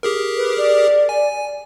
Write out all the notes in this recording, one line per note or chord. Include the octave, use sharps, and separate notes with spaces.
G4 G#4 A#4
B4
D5
G#5